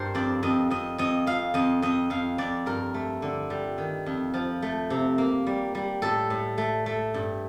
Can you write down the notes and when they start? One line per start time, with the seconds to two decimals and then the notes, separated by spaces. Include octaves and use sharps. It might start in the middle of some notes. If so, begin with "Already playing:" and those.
Already playing: G2 A#4 C5
0.15 F2 D5
0.43 F2 D#5
0.70 F2 D#5
0.98 F2 D#5
1.27 F2 F5
1.54 F2 D#5
1.82 F2 D#5
2.10 F2 F5
2.38 F2 D5
2.66 G2 A#4
2.94 A3
3.22 D3
3.50 G3
3.78 D#3
4.06 F2
4.34 F3
4.62 A3
4.90 C3
5.18 A#3
5.47 G3
5.75 G3
6.02 A2 A4
6.30 A2
6.58 A3
6.86 A3
7.14 G2